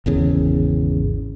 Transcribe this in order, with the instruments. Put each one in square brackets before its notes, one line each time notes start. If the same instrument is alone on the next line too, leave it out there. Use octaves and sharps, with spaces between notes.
[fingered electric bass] G#1 E2 C#3